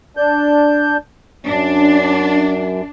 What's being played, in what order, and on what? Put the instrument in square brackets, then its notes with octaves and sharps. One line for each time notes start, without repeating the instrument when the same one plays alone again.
[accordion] D4 G6
[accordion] F#2 [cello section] D4